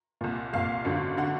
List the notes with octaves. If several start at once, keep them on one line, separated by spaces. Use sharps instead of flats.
C2 A#2
C2 A#2 F5
G#1 F#2 D3
D3 F#5